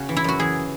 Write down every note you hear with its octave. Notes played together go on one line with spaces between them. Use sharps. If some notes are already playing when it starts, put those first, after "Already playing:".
Already playing: C#3 F#4
E3
E4
F#2 F#4
E3 G#4